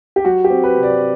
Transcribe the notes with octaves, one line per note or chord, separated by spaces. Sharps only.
G4
F#3 F#4
G4
C4
B4
C3
D5